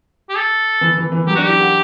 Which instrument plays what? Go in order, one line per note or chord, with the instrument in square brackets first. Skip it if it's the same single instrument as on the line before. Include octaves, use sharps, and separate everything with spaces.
[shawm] G4
A4
[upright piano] E3
E3
E3
[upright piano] F#3 [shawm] G4
[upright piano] D4 [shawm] F#4
[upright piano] E4 [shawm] G4
[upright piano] F#4